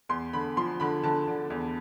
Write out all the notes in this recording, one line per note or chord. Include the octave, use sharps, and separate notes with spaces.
E2 C6
D3 B5
F3 C6
D3 B5
D3 A5
D3
E2